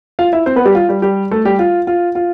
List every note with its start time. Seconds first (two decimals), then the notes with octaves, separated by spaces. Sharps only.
0.19 F4 F5
0.33 E4 E5
0.46 C4 C5
0.56 B3 B4
0.65 G3 G4
0.75 F4
0.89 G3 G4
1.02 G3 G4
1.31 A3 A4
1.45 G3 G4
1.59 F4
1.87 F4
2.15 F4